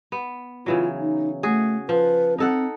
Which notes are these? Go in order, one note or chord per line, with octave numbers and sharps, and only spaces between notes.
B3
C#3 E3 F#3 F4
D#4
A3 F#4 G#4
F3 B4
C4 D#4 A4 F#5